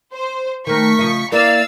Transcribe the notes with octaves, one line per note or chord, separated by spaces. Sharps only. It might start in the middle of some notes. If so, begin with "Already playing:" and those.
C5
D#3 A3 A#4 C#6 B6
C#3 F3 D#5
A#3 E4 A#4 D5 F5 E6